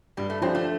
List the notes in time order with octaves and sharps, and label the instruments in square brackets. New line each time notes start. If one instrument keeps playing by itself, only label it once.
[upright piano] G2 [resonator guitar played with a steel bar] G3
[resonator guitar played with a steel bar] A3
[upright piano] F3 D4 G4 C5 [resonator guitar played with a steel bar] C4
[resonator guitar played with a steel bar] A3